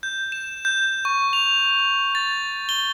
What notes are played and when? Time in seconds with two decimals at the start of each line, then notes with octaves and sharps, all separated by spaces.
0.03 G6
0.32 E7
0.65 G6
1.05 C#6
1.33 F7
2.15 A6
2.69 G7